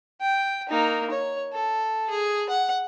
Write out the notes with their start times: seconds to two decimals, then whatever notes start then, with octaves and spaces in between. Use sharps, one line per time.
0.21 G5
0.69 A#3 D#4
1.11 C#5
1.53 A4
2.10 G#4
2.49 F#5